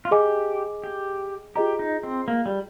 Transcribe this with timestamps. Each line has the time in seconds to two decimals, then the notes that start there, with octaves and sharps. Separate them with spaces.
0.05 F4
0.11 G4 G#4 D#5 G#5 D6
0.84 G4
1.55 F4 G4 G#4 D#5 A#5
1.79 D#4
2.03 C4
2.28 A#3
2.46 G3